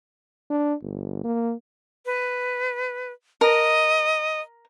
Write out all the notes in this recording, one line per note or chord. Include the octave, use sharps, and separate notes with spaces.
D4
G1
A#3
B4
A#4 D#5